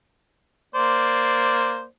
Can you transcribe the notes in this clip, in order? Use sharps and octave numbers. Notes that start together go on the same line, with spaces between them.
A#3 C5 D5